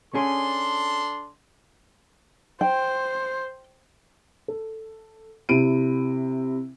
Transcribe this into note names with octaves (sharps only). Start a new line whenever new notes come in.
C#4 D4 G#4 A4 C6
C5 G5
A4
C3 E4 B5 D7 D#7